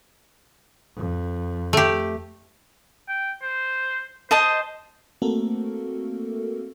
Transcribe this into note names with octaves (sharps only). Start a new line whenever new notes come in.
F2
A3 G4
G5
C5
C5 D#5 A5 D#6
A3 A#3 C4 F#4 A4 A#4